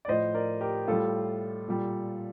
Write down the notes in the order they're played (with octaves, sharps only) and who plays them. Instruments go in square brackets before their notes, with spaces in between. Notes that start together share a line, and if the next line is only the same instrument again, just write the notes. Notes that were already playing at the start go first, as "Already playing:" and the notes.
[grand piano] D5
A2 F3 C5 D#5
A#4 D5
G4 A#4
A2 G3 F4 A4
A#2 G3